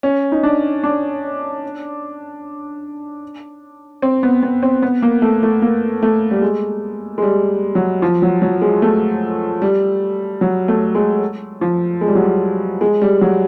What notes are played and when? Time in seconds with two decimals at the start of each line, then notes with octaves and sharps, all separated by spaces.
0.03 C#4
0.32 D#4
0.43 D4
0.84 D4
4.02 C4
4.23 B3
4.42 B3
4.63 C4
4.82 B3
5.02 A#3
5.22 A3
5.43 A3
5.62 A#3
6.03 A3
6.31 G3
6.42 G#3
7.18 G#3
7.22 G3
7.75 F#3
8.02 F3
8.22 F#3
8.42 F#3
8.62 G#3
8.82 A3
9.62 G3
10.41 F#3
10.68 A3
10.95 G#3
11.61 F3
12.01 G#3
12.08 G3
12.15 F#3
12.23 G3
12.81 G#3
13.02 G3
13.21 F#3